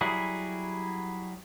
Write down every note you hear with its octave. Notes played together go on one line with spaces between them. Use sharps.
F#3 G3 E4 F#4 G#4